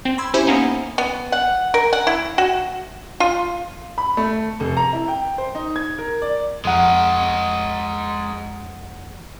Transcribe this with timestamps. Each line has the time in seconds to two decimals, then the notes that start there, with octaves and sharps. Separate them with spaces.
0.05 C4
0.18 B5 C6 E6 G#6
0.34 C#4 E4 G4 C5 E5
0.47 A#3 B3 C#4 D#4
0.98 B3
1.32 F#5
1.74 A#4
1.93 F#5
2.07 E4
2.38 F#4
3.20 F4
3.98 B5
4.17 A3
4.60 F1
4.77 A#5
4.93 E4
5.08 G5
5.38 C5
5.55 D#4
5.76 G#6
5.99 A#4
6.22 D5
6.65 F2 G#3 A#4 F#5